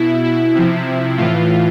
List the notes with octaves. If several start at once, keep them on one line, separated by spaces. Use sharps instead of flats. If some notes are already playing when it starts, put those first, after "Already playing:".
Already playing: B2 E4
E4
C3 F3
A2 E3 F4